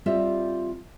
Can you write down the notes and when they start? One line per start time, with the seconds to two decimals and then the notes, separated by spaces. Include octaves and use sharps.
0.06 G3 C4 F4 G4 D#5 E5